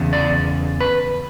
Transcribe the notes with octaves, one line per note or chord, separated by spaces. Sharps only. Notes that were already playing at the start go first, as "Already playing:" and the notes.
Already playing: E2 C#3
D5
B4